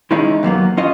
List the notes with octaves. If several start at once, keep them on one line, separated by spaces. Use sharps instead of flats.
D#3 E3 G#3 C#4 D#4 E4
D#2 F#3 A#3 B3
C#4 F4 D#5